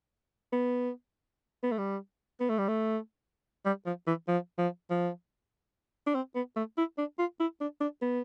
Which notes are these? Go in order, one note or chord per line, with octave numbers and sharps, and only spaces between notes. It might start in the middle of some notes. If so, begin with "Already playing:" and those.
B3
B3
A3
G3
B3
A3
G3
A3
G3
F3
E3
F3
F3
F3
D4
C4
B3
A3
E4
D4
F4
E4
D4
D4
B3